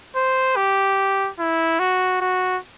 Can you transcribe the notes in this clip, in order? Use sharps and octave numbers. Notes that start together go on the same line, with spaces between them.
C5
G4
E4
F#4
F#4